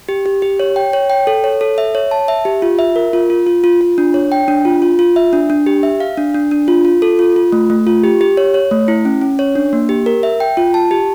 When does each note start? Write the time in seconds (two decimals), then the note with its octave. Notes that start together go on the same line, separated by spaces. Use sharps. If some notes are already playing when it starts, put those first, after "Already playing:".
0.09 G4
0.26 G4
0.42 G4
0.60 C#5
0.76 G5
0.93 C#5
1.10 G5
1.27 A4
1.44 C#5
1.61 A4
1.78 E5
1.95 C#5
2.11 A5
2.28 E5
2.45 G4
2.62 F4
2.79 E5
2.96 A#4
3.13 F4
3.30 F4
3.47 F4
3.64 F4
3.81 F4
3.98 D4
4.14 C#5
4.32 G5
4.48 D4
4.65 F4
4.82 F4
4.99 F4
5.16 E5
5.33 D4
5.50 D4
5.66 G4
5.83 E5
6.00 F5
6.17 D4
6.34 D4
6.51 D4
6.68 F4
6.85 F4
7.02 A4
7.19 F4
7.36 F4
7.52 A3
7.70 A3
7.87 F4
8.04 G4
8.21 G4
8.37 C#5
8.54 C#5
8.71 A3
8.88 E4
9.05 C#4
9.21 C#4
9.39 C#5
9.55 D4
9.73 A#3
9.89 G4
10.06 A#4
10.23 E5
10.40 G5
10.57 F4
10.74 A5
10.91 G4